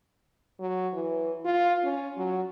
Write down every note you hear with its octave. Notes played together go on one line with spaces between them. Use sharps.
F#3
E3
F4
C#4
F#3